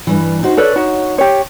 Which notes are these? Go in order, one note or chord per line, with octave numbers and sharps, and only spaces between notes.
G2 E3
D#4 F#4 C5
A4 B4 C#5 D5
D#4 F#4
G4 C#5